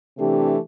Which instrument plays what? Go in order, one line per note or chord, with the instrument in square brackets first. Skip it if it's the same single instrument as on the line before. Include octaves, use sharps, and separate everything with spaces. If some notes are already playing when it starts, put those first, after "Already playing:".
[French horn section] C3 E3 A3 D4 G4